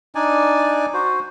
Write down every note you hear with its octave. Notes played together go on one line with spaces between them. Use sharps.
D4 D#4 D5 G#5
F#4 C5